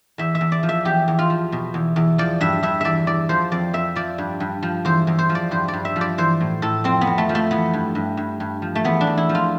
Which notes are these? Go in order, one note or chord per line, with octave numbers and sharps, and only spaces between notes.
E2 E5
E5
E2
D5
F3
E5
E2 G4
E2
F4
F3
B2
E2
E2
F3 D5
G2 E5
G2 E5
E2 D5 E5
E2 D5
F3 C5
F2 D5
F2 E5
F3 D5
G2
G2
F3
E2 C5
E2
C5
F3
D5
G2 C5
D5
G2
E5
F3
D5
E3 C5
A2
A2 A4
F2 C4
B3
F2
A3
F3
A3
E3 B3
G2
G2
G2
G2
F3
A3
E2 B3
D4
E2
E4
F3
F4